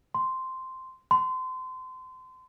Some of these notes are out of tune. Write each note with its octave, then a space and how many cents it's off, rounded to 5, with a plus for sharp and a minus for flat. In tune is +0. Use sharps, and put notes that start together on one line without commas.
C6 -5
C6 -30